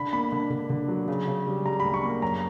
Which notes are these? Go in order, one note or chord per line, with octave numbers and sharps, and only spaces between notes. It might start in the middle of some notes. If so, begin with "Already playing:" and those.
Already playing: D3 B5
A#3 B5
D3
D3
D3
F#3
C#3
C#3
G3
G3 A#5
D2 B5
C#6
A#3
F#2 A#5